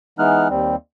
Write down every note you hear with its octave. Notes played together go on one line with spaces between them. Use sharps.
E3 G#3 B3 D#4 F6 F#6
D#2 G3 C4